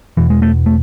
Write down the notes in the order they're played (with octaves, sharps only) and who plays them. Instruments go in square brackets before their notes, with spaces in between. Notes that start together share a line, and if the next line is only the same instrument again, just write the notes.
[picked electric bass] E2 B2 E3
G#3
A3
A3